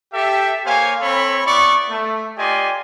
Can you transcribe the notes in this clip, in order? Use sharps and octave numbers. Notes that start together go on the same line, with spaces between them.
G4 A4 E5
A#3 C5 C#5 F5 G#5
C4 A4 C#5 B5
B3 E4 D5 C#6
A3
F4 G4 D5 D#5 G#5 C6